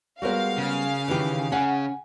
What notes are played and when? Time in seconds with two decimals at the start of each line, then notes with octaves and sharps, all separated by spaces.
0.22 G3 G#3 B3 F#4 A#4 C5 F5
0.58 C#3
1.08 D#3 E3 G4 B4
1.52 C#3 C#4 F#5 G#5